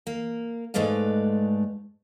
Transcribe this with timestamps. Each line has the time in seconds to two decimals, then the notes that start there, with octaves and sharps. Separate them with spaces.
0.07 A#3
0.74 G#2 G#3 A3 B4 D5 F5